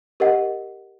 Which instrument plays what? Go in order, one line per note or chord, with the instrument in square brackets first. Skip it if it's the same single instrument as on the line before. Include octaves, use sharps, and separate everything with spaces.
[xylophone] G4 A#4 D#5 F#5